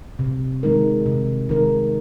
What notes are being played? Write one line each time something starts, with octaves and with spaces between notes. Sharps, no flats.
C3
D#3 G#3 D#4 A#4
C3
D#3 G#3 D#4 A#4